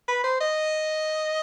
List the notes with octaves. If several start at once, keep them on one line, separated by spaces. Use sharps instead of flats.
B4
C5
D#5